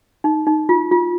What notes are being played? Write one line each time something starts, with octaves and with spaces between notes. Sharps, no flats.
D#4
D#4
F4
F4